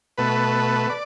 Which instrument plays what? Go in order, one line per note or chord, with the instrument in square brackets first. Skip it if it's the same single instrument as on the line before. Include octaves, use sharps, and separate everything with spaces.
[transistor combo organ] B2 A3 B4
D5